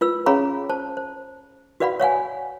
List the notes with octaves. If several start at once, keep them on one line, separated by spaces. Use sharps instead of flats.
F4 B4 E6
C#4 G#4 C#5 F5 A#5 B5
C5 A5
C5
F#4 B4 D5 F5 F#5 B5
C#5 F5 F#5 G#5